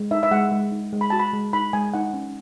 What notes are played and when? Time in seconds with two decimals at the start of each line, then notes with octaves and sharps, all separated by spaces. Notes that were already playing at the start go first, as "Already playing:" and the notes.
Already playing: G#3
0.11 D#4 E5
0.23 E5
0.31 G#3 F#5
0.52 G#3
0.72 D#4
0.92 G#3
1.01 B5
1.10 F#4 A5
1.20 B5
1.33 G#3
1.53 D#4 B5
1.73 G#3 G#5
1.94 D#4 F#5
2.14 C#4